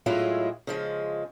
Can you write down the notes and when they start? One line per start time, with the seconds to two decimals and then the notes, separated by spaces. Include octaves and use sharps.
0.06 A2 F#3 G#3 E4 F4 G#4
0.67 C#3 F3 G#3